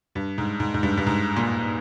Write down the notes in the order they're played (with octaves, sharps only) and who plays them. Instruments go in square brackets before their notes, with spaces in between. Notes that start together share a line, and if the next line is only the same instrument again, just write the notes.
[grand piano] G2
G#2
G#2
G#2
G2
G2
G#2
A#2